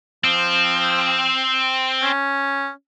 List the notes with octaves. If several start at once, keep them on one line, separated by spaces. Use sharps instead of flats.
F3 C4
C#4